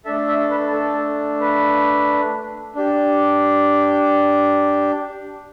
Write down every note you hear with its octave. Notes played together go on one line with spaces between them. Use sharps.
A3 D4 A4 E5
E5
B4
A4
B4
D4 G4